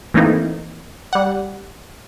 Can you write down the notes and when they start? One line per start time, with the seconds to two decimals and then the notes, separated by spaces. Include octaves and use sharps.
0.14 E3 A3 A#3 C4 D#4 E4
1.13 G3 F#5